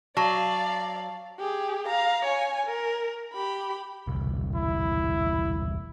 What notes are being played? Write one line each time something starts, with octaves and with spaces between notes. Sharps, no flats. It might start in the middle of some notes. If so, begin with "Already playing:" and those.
F#3 D5 F5 A5
G4 G#4
F5 A#5
C#5 G#5
A#4
G4 B5
E1 C2
E4